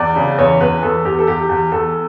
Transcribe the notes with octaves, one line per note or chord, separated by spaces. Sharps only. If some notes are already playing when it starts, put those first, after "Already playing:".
Already playing: E2 D5
C#3
E2 C#5
E2 B4
E2 A4
E2 G4
A4
E2 G4
E2
E2 A4